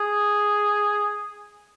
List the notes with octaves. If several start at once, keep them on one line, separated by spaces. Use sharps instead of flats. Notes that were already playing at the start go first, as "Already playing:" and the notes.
Already playing: G#4